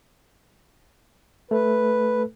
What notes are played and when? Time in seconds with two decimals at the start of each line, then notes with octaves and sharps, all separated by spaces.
1.51 A3 A4 B4